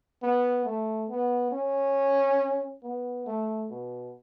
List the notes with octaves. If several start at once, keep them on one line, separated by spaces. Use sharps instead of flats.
B3
A3
B3
C#4
B3
A3
B2